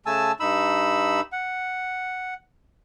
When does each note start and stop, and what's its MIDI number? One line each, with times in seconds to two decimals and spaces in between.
0.06 0.32 49
0.06 0.32 57
0.06 0.32 80
0.06 0.32 81
0.06 0.32 88
0.40 1.21 43
0.40 1.21 63
0.40 1.21 83
0.40 1.21 88
1.32 2.34 78